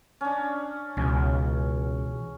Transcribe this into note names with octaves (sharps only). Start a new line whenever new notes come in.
C#4 D4
C#2 B2 E3 C#4